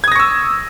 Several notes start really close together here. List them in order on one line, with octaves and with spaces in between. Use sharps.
G#6 D#6 A#6 C#6 E6